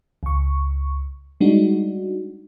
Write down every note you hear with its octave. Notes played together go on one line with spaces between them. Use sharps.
C#2 C#6
G3 G#3 D4 D#4 F#4